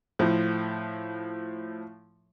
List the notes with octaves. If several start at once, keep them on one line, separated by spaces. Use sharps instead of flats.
A2 F3